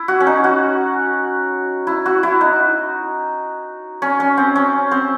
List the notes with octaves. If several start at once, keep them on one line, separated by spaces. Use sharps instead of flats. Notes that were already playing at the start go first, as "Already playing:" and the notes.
Already playing: E4
F#4
C#4
D#4
F#4
E4
F#4
E4
D#4
C#4
C#4
C4
C#4
C4